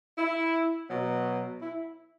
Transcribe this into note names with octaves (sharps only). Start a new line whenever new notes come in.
E4
B2 F#3
E4